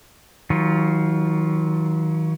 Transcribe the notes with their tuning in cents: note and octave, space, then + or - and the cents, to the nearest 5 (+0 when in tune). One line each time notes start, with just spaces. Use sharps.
D#3 +40 F#3 +0 F4 +0